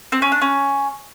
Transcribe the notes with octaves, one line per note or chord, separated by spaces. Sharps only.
C4
C#4
D4
C#4